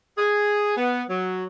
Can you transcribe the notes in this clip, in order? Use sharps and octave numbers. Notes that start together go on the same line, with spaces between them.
G#4
B3
F#3